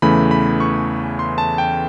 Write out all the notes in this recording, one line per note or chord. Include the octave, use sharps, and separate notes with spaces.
E2 C#3 E3 A3 B5
B5
C#6
C6
A5
G5